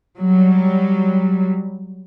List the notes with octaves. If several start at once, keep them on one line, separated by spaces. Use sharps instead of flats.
F#3 G3